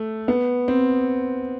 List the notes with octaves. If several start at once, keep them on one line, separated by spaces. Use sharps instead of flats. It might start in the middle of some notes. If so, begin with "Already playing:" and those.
Already playing: A3
B3
C4